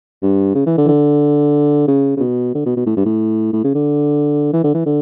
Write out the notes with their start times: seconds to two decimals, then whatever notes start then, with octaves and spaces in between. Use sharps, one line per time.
0.22 G2
0.55 C#3
0.66 E3
0.78 D3
0.85 E3
0.88 D3
1.88 C#3
2.17 C#3
2.20 B2
2.55 D3
2.66 B2
2.77 B2
2.86 A2
2.97 G2
3.05 A2
3.53 A2
3.64 C#3
3.75 D3
4.53 E3
4.64 D3
4.74 E3
4.86 D3